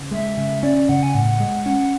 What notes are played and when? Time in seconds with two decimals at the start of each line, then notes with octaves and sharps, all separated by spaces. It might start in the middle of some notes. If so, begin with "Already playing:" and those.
Already playing: C#3
0.11 G#3 E5
0.37 C#3
0.63 C#4 D5
0.89 C#3 F#5
1.03 G#5
1.14 A2 F#5
1.40 G#3
1.65 C#4 F#5